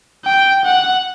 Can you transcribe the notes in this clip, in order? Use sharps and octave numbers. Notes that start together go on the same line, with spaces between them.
G5
F#5